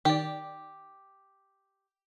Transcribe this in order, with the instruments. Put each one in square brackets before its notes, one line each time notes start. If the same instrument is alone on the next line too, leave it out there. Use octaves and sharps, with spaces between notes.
[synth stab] D#3 D5 [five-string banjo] G4